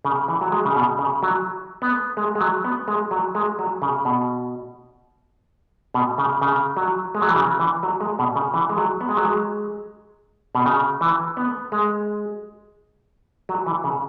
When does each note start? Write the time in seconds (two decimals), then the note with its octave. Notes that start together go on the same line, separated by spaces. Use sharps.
0.05 C#3
0.28 E3
0.41 F#3
0.52 G#3
0.65 C#3
0.76 B2
0.99 C#3
1.23 F#3
1.82 B3
2.17 G#3
2.35 G#3
2.41 F#3
2.65 B3
2.88 G#3
3.11 F#3
3.35 G#3
3.59 F#3
3.82 C#3
4.05 B2
5.94 B2
6.18 C#3
6.42 C#3
6.77 F#3
7.15 G#3
7.22 F#3
7.29 E3
7.36 C#3
7.60 E3
7.83 F#3
8.01 G#3
8.19 B2
8.36 C#3
8.54 E3
8.70 G#3
8.77 F#3
9.01 B3
9.09 G#3
9.17 F#3
9.25 G#3
10.55 B2
10.66 C#3
11.01 E3
11.37 B3
11.72 G#3
13.49 F#3
13.66 E3
13.84 C#3